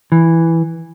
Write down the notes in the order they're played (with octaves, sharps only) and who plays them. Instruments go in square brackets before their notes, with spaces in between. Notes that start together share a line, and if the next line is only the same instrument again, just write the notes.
[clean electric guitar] E3